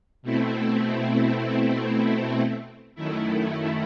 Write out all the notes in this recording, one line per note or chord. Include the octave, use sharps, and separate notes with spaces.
B2 A3 C4 E4
F#2 D#3 A3 E4